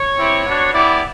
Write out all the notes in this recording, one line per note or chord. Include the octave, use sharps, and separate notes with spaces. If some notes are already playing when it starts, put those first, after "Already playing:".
Already playing: C#5
C4 E4 G4
B3 D4 F#4
B3 E4 G4 D5